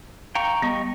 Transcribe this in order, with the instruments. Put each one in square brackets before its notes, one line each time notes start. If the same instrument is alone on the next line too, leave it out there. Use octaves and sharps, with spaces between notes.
[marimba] F5 [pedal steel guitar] G5 A#5 C#6
[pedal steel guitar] G3 D#5 C#6 [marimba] B3